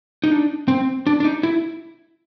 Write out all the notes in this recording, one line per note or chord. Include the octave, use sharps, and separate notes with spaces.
D#4
D4
C4
D4
D4
D#4
E4